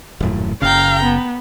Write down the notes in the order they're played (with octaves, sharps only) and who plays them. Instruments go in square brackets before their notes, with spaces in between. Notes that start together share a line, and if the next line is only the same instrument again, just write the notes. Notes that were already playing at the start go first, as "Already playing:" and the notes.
[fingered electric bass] D#1 F#2 A2
[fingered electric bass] F#1 C#3 [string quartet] F5 G5 A#5
[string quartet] B3